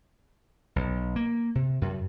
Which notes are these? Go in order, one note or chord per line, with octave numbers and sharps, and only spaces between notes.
B1
A#3
C3
F#2